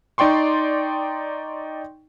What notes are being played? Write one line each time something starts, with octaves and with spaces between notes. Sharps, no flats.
D#4 D5 G5 C6 C#6